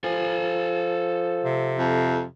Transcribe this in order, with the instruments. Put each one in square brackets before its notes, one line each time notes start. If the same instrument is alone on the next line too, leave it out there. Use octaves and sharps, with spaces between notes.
[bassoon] F3 [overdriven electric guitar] A4 G#5
[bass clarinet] C3
[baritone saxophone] F2